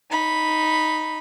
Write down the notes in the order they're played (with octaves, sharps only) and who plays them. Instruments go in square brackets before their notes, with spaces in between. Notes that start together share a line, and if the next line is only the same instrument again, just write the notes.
[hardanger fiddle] D#4 B5